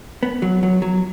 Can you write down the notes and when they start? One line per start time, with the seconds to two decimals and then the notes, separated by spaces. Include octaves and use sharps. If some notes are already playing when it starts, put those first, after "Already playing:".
0.23 B3
0.42 F#3
0.63 F#3
0.82 F#3